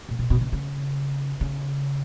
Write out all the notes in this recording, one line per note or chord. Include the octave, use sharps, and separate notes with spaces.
A#2
B2
B2
C#3
C#3
C#3